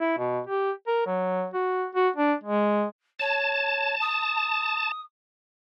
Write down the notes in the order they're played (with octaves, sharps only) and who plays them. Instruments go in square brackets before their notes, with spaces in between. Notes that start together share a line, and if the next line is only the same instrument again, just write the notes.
[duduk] E4
B2
G4
A#4
F#3
F#4
F#4
D4
G#3
[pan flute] C#5 [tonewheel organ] A5
[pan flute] D#6